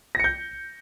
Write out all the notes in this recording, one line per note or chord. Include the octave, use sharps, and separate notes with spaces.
G6 A#6 C#7